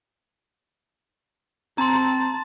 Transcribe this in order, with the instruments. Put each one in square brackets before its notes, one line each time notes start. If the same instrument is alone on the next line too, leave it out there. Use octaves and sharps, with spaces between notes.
[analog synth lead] C4 [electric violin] A5 [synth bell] A#5 C6